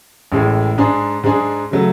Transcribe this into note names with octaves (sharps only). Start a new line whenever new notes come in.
A1 A2 G#3
G#2 G#3 D4 G#4
G#2 G#3 D4 G#4
C#3 F#3 A3